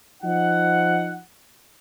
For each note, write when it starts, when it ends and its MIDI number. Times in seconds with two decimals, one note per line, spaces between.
0.23 1.18 53
0.23 1.18 63
0.23 1.18 78